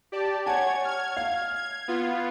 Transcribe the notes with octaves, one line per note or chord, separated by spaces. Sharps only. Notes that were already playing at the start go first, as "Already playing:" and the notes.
G4 D5 A5
C#5 F#5 G#5 A5 G#6
F6 G#6
F5
G#6
B3 F4